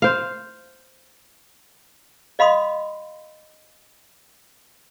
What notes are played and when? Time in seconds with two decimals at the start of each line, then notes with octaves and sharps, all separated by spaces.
0.02 C5 F5
2.39 D#5 F5 B5 C6 D#6